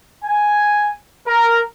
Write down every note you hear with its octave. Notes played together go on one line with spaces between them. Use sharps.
G#5
A#4